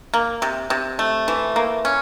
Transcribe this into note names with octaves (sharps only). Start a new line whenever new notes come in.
A#3
C3
C3
A3
E3
A#3
C#4